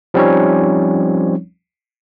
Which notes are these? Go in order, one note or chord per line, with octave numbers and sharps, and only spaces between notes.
F3 G3 C4 C#4 D#4 C#5